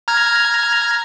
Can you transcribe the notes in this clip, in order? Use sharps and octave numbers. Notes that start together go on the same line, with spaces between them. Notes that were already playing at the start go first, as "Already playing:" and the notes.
A#5 F6 G#6